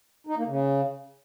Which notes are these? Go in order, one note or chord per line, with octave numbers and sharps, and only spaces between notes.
D#4
A#3
C#3